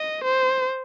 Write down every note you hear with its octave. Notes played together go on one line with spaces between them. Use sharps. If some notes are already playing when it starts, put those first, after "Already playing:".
Already playing: D#5
C5